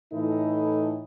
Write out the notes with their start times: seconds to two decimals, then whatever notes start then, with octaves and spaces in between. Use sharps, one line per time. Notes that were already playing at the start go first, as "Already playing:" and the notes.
0.13 A2 E3 D#4 E4 A4 D#5